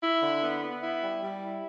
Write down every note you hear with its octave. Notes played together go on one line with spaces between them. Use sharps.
E4
D3
B3
B3
E4
G3
G3
E4